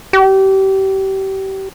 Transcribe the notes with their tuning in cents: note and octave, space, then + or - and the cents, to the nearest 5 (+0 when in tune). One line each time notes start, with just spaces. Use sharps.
G4 -30